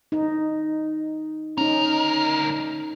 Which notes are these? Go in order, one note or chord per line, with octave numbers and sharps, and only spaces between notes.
D#4
D2 C#4 D#4 A#4